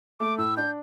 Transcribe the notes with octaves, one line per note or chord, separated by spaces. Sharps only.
A3 D6
A2 E6
D4 G6